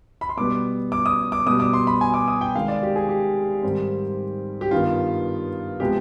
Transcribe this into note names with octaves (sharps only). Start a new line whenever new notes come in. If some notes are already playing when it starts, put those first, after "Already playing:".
B5
C6
B2 G3 B3 D6
D6
D#6
D6
B2 G3 B3 D#6
D6
C6
B5
G#5
D6
D#6
G5
C3 D#3 G#3 F5
D5
G4
G#4
G4
G#2 D#3 G3 C4
G4
G2 D#3 B3 F4
C3 F3 G#3 B3 G4